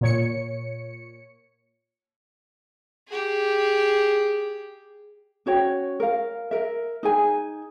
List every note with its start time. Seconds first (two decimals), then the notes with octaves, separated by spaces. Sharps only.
0.01 A#2 C#5 C#7
3.08 G4 G#4
5.46 C#4 F#4 C#5 G5
6.00 A#4 F5
6.51 A#4 E5
7.03 D#4 G#4 G#5